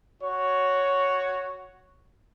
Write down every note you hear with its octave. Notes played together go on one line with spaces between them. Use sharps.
F#4 C#5